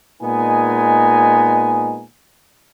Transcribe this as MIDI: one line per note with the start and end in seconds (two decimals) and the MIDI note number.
0.22 2.04 46
0.22 2.04 56
0.22 2.04 59
0.22 2.04 63
0.22 2.04 80